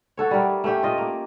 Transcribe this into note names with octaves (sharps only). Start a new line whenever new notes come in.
F#4 A4 C#5
G3 A3 A#4
A3 C#4 G4 G5
F4 D#5
A#3